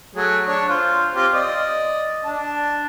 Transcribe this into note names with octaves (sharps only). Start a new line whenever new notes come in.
F#3 A3 G#4
D4 C#5
F4 C5
C4 F4 G4
D5 D#5
D4 A5